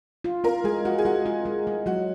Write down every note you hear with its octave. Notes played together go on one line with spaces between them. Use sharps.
F4
F4 A#4
G#3 G#4
F4 F#4
G#4
G#3 F#4
F4
G#3
G#3
F#3 F#4